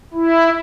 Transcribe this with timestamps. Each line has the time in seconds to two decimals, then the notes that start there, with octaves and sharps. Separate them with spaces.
0.14 E4